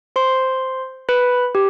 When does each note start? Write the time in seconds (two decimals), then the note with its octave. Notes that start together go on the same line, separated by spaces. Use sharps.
0.16 C5 C6
1.09 B4 B5
1.55 G4